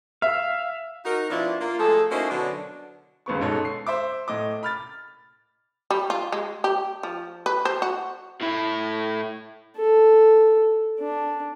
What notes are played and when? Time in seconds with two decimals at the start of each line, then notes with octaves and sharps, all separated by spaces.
0.22 E5 F5
1.05 D#4 F#4 A#4
1.30 B2 F3 D4 E4 F4
1.61 A#3 F4
1.79 F3 G#3 A3 G#4 A4
2.10 A#3 C#4 D#4 E4 F#4 C5
2.30 B2 D3 F#3 D4
3.26 G1 C#2 B3 C#6
3.41 G#2 B2 A4 C#5
3.65 C7
3.87 C5 E5 D6
4.28 A2 D#5 D6
4.63 B5 F6 A6
5.91 G3
6.10 F4
6.32 G#3
6.64 G4
7.03 F3
7.46 B4
7.65 C5
7.82 F#4
8.41 A2 E4
9.77 A4
11.00 D4